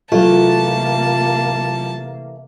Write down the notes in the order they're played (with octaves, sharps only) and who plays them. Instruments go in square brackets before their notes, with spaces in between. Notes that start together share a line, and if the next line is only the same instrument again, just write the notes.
[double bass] C3 A#3 [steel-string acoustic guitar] E3 A3 [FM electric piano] F#3 F4 [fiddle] A5